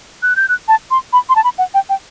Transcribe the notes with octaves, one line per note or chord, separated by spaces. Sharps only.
F#6
G6
F#6
A5
C6
B5
C6
A5
B5
F#5
G5
G5